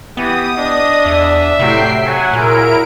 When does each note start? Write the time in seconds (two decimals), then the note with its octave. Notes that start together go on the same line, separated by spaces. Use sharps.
0.17 E3 B3 G4 D#6
0.56 D4 D#5
1.06 E2 E5
1.59 A2 C3 F#3 G5 C7
2.05 F#3 F#5 G#5
2.33 A#2 E4 G#4 A#4 D7